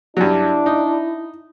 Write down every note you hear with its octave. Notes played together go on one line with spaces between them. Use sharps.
G2 F#3 D4 E4
D#4